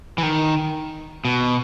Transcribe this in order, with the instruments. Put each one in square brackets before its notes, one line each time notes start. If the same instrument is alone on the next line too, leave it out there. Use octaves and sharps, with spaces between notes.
[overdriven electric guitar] E3
D#3
B2